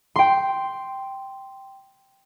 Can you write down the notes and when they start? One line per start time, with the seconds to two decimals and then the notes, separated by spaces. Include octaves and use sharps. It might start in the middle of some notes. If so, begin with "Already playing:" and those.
0.16 G5 C6